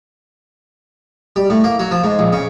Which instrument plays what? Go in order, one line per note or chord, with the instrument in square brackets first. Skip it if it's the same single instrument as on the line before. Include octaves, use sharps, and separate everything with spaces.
[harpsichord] G3
A2
A#3
F#3
F3
G#2
A#1
C#3